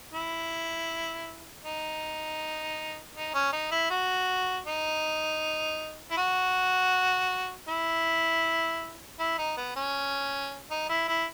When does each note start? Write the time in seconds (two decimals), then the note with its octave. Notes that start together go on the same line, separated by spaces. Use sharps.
0.13 E4
1.64 D#4
3.15 D#4
3.34 C#4
3.53 D#4
3.71 E4
3.90 F#4
4.66 D#4
6.11 E4
6.17 F#4
7.69 E4
9.19 E4
9.38 D#4
9.57 B3
9.76 C#4
10.71 D#4
10.89 E4
11.08 E4